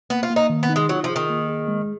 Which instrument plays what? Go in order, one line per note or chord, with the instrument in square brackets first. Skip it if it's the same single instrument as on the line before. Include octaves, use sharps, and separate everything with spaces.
[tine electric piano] A#3 [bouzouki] B3
[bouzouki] F4
[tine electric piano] A#3
[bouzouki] D#4
[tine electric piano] D#3
[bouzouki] B3
[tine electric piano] D#4
[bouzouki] G#3
[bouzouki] F#3 [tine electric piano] F4
[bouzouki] F3
[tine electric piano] G#4
[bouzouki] D#3
[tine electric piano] A#3
G#4
G#3